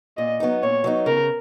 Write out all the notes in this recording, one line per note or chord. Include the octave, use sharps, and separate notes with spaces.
A#2 D#5
F#3 B3 D#4
A#2 C#5
F#3 B3 D#4
C#3 A#4